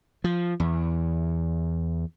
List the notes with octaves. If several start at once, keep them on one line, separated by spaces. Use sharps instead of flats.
F3
E2